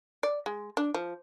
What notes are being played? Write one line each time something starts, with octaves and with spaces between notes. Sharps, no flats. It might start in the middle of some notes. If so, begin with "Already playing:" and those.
D5
G#3
D4
F3